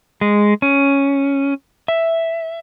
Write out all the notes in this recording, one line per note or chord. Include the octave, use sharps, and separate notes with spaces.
G#3
C#4
E5